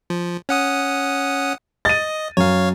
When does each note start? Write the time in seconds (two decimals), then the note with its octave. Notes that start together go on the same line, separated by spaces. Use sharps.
0.10 F3
0.49 C#4 F#5 D#6
1.85 D#5 A6 D#7
2.37 F#2 C#5 F5